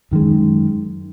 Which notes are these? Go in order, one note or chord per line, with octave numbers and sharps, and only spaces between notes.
F#2 D#3 G#3